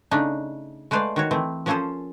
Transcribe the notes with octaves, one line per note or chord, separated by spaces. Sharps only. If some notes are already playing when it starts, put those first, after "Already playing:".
C#3 A3 D4 D#4
G#3 A3 B4 C5 D5 F5
D#3 F#4 C#5
E3 A3 C4
F3 A#3 C#4 G#4 A4 C5